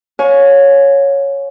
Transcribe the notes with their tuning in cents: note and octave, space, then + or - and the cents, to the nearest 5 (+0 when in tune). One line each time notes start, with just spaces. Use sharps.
C#5 +0 F5 +35 G#5 +20